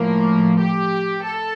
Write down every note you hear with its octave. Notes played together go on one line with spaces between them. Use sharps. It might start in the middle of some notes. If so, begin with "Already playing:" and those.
Already playing: A2 F3 A#3
G4
A4